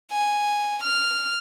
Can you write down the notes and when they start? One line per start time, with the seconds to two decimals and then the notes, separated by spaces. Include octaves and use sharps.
0.12 G#5
0.83 F6